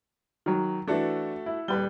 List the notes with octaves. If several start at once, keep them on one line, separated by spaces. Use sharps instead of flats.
D#3 F#3
E3 A3 D4 F#4 A4
E4
D#1 G3 B4 G7